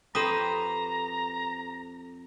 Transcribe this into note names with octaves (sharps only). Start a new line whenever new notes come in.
F2 C4 G4 A4 B4 C5 A#5 D#6